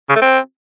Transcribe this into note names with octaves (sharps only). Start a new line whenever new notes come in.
C#3
A3
C4